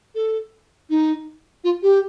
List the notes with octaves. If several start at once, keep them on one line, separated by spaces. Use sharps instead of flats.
A4
D#4
F4
G4